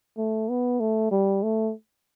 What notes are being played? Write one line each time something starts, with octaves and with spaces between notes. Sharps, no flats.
A3
B3
A3
G3
A3